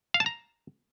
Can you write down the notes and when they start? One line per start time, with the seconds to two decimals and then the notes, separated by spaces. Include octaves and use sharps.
0.14 F5
0.20 A5
0.26 A#5